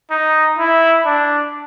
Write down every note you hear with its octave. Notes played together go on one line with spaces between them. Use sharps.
D#4
E4
D4